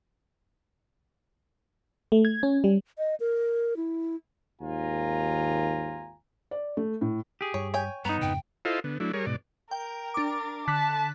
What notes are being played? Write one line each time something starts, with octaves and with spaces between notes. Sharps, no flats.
A3
G#6
C#4
G3
D#5
A#4
E4
G#1 D#2 F4 G#5 A#5
D5
A3
A2
G4 G#4
G2 C#5
C#5 G5 G#5
G2 B3 D#4 A#5
F2 G#2 C#3 G5
E4 F4 A4 C5 D#5 F5
D3 B3
F#3 A3 D4 E4
G3 G#4 A#4 C#5
G#2 B2 D5
A#4 G5
D4 D6
D3 A5 F#6 B6